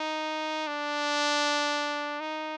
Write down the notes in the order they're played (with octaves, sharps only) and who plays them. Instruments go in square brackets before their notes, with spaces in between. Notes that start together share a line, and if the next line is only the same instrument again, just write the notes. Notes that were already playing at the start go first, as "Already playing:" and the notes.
Already playing: [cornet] D#4
D4
D#4